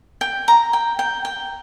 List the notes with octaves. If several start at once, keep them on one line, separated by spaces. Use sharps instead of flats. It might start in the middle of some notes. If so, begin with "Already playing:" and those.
G5
A#5
G5
G5
G5